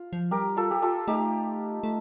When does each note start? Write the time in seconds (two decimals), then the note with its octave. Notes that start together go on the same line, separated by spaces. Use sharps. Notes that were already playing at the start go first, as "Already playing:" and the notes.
Already playing: F4
0.13 F3
0.31 G3 G4 A#4
0.57 F4 A4
0.71 G4
0.82 F4 A4
1.07 A3 D#4 G4
1.84 A3